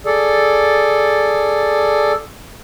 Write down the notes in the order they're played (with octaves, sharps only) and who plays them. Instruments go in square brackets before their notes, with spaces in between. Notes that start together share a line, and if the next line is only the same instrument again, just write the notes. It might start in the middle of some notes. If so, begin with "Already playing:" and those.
[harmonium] G#4 A4 D5